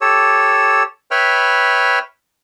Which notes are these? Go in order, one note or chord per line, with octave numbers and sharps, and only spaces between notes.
G4 A4 C#5 E6
B4 C#5 E5 G5 B5 F6